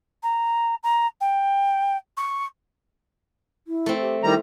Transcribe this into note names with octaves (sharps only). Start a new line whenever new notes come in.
A#5
A#5
G5
C#6
E4
A3 C4
G4
D#3 G3 E4 A#5